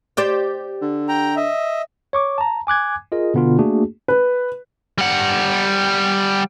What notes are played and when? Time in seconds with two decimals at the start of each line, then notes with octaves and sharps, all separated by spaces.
0.17 G4 C5 D5
0.82 D3
1.09 G5 A#5
1.36 D#5 E5
2.13 C#5 C#6 D6
2.38 A5 A#5
2.67 G#5 D6 F#6 G#6
3.12 F4 G#4 A#4 D#5
3.34 B2 D3 B3 D4 F4
3.58 A3 A#3 D4 F#4 G#4
4.08 B4
4.98 G3 F#5